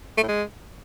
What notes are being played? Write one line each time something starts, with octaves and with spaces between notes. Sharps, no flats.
A3
A2
G#3